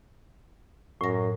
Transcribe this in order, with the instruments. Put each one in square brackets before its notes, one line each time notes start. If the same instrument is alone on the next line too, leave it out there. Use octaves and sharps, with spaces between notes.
[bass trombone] F#2 [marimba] A2 A#6